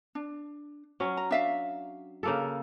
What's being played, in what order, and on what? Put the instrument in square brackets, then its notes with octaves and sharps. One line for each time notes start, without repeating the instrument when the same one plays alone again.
[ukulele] D4
[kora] F#3 C#4
[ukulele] A#5
D4 E5 F5
[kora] C#3 A#3 A4